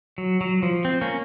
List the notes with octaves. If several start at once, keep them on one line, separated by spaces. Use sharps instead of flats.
F#3
F#3
F3
C4
A#3 C#4